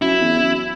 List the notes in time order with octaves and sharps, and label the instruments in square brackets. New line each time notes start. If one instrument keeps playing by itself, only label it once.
[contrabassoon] F#2 [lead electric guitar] E4
[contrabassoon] E2
F#2